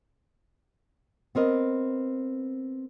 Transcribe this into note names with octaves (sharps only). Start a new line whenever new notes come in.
B3 C4 A#4 D#5